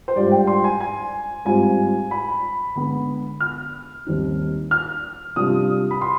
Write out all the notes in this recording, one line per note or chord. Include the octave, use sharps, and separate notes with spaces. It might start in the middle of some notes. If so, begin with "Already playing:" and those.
C5
G#2 G3 D4 F4 D5
G5
C6
G#5
G#5
G#2 G3 C4 F4 G#5
B5
D3 G#3 B3 B5
F6
D#2 D#3 G3 C4 D#4
F6
C3 G3 D4 F4 D#6
B5
C6